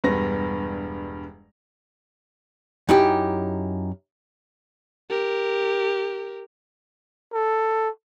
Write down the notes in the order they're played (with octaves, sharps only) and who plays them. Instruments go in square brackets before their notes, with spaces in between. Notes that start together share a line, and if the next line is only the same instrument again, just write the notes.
[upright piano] E1 G2 B3 A#6
[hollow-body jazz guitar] F#2 D#4 E4 G4
[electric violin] G4 A#4
[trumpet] A4